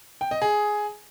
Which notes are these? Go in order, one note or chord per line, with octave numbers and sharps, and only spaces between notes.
G5
D#5
G#4